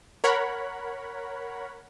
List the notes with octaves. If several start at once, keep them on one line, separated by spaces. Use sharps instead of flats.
A#4 C#5 F#5 B5